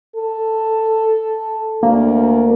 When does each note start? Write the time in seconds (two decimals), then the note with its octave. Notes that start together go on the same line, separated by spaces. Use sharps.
0.16 A4
1.83 D2 A#3